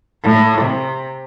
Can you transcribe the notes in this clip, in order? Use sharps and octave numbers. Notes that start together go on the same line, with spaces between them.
A2
C3